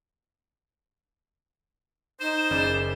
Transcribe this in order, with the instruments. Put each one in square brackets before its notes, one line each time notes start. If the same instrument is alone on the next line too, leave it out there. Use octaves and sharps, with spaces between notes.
[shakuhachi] D#4 [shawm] C5 [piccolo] E7
[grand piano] F#1 C#3 D5